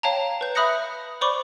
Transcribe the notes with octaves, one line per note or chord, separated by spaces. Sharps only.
C#5 F5 G5 A5 A#5
B4 G6
E5 B5 D#6 F#6 A#6 C#7
C5 D5 B5 C#6 D6 G7